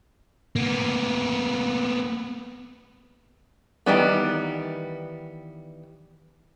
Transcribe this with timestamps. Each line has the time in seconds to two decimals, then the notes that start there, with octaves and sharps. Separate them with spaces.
0.56 A#3 B3
3.86 D#3 E3 G3 B3